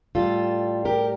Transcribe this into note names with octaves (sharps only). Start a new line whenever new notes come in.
A2 G3 F4 A4
G4 A#4